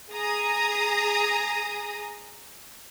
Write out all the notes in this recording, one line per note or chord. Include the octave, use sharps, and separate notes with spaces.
G#4 A#5 D#6